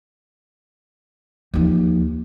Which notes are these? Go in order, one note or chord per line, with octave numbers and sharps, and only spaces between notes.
D#2 F3